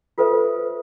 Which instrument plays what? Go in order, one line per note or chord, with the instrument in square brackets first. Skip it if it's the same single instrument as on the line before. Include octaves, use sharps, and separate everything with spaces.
[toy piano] F4 A4 B4 C5 E5